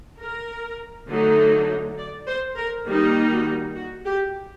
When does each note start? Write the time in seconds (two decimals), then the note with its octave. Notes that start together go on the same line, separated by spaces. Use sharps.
0.20 A#4
1.09 D3 F#3 A3 D#4
1.98 D5
2.27 C5
2.57 A#4
2.88 D#3 G3 A#3 D#4
3.32 F#4
3.76 F#4
4.06 G4